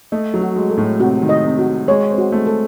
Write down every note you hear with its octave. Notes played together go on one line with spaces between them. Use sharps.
A3 D#5
F#3
F#4
G#3
A4
A2
C3 F#4
D#3
D#5
C3
F#4
G#3 C#5
C4
F#4
A3
A4